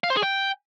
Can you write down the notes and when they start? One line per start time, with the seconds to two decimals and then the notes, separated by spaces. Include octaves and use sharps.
0.04 F5
0.10 C5
0.17 G#4
0.23 G5